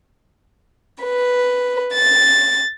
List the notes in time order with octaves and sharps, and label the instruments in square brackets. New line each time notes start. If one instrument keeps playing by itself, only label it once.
[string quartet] B4
A6